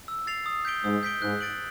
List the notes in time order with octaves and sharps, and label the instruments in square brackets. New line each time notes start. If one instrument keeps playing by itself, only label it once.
[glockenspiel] E6
A6 C7 F7
D#6
G6 B6 D7 G7
[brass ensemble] G#2 [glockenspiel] D#6
[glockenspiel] G6 B6 D7 G7
[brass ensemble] G#2 [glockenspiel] F#6
[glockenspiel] A6 D7 F#7